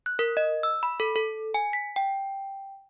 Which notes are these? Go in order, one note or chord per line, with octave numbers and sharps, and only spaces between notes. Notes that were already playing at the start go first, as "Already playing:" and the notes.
F#6
A#4
D#5
E6
B5
A4
A4
G#5
B6
G5